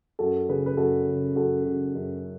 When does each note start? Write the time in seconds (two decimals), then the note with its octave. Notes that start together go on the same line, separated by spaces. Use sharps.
0.19 F#2 F#4 A4
0.49 C#3 G#4 B4
0.66 B4
0.77 F#2 F#4 A4
1.07 C#3
1.36 F#2 F#4 A4
1.65 C#3 F#4
1.94 F#2 G#4